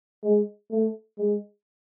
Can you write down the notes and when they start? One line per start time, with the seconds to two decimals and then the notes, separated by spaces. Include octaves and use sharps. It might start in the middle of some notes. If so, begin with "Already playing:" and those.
0.23 G#3
0.71 A3
1.18 G#3